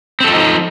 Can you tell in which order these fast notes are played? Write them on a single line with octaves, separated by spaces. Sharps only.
C4 A4 F3 D#4